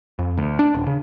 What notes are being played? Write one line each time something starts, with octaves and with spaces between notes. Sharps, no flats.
F2
D2
D4
D#1
C#3